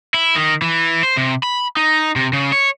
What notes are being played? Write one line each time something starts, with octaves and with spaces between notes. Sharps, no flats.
E4
D#3
E3
C5
C3
B5
D#4
C3
C#3
C#5